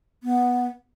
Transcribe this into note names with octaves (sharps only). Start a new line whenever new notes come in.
B3